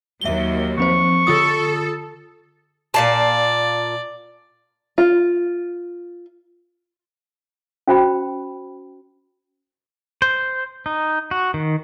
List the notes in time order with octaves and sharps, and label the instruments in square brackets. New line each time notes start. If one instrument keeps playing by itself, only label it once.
[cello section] D#2 F#3 [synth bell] E5 G7
[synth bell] F3 C4 C5 [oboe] C#6
[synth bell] D3 F4 D#6 [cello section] A4
[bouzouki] A#2 F5 A5 [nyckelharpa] D5
[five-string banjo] F4
[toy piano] C#4 F#4 C5 G5 B5
[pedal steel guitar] C5
D#4
F#4
D#3